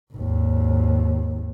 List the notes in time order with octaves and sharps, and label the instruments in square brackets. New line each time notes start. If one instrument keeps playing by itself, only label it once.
[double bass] G#1 D#2